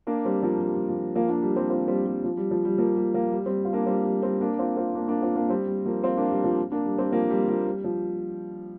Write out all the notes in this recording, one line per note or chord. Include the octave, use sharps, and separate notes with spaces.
A#3 D4
G3 C4
F3 A#3
G3
G3
F3
F3 A#3
A#3 D4
G3
G3 C4
C4 F4
G3 C4
G3
F3
G3
F3
G3
F3 A#3
G3
F3 A#3
G3
G3 C4
F4
A#3 D4
G3 C4
G3
G3 C4
A#3 D4
C4 F4
C4 F4
A#3 D4
A#3 D4
C4 F4
A#3 D4
G3 C4
G3
F3 A#3
C4 F4
A#3 D4
G3
F3
A#3 D4
G3
G3 C4
F3 A#3
G3
F3 A#3
G3
F3